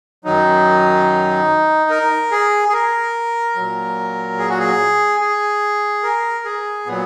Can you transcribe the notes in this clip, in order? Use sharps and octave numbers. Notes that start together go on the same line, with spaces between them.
F#2 D#3 F#3 D#4
A#4
G#4
G#4
A#4
A#2 F#3
G#4
F#4
G#4
G#4
A#4
G#4
A#2 F#3 B3